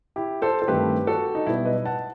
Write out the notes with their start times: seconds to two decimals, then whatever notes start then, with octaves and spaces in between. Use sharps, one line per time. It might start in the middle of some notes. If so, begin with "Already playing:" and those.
0.16 E4 G4
0.42 A4 C5
0.62 A4
0.68 G2 D#3 A3 C4 G4 B4
1.07 F#4 A4
1.35 D#4
1.46 B1 B2 G3 B3 E4
1.65 B4 D#5
1.85 F#5 A5